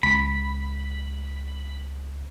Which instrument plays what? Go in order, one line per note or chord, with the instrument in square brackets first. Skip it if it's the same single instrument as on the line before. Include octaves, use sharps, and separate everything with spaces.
[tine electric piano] C#2 [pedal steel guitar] B5